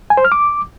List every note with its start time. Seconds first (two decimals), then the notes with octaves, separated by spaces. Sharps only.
0.10 G#5
0.17 C5
0.25 F6
0.32 D6